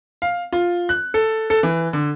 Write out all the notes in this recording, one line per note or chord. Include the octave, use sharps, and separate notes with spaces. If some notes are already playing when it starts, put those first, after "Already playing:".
F5
F4
F#6
A4
A4
E3
D3